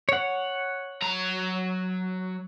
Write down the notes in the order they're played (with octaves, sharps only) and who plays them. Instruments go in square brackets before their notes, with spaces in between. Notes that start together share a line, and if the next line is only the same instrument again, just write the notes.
[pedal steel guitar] C#5 F#5
[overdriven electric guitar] F#3 A#5